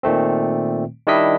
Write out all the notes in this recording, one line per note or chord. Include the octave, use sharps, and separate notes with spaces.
A#2 D#3 A3 C4
D#3 G3 D4 E4 D#5 B6